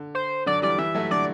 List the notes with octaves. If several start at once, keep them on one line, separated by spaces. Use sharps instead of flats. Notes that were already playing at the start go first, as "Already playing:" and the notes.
Already playing: D3
C5
D3 F#3 D5
E3 G3 D5
E3 G3 E5
F#3 A3
D3 F#3 D5